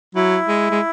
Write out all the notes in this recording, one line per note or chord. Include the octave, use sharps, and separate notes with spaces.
F#3 E4
G#3
G#3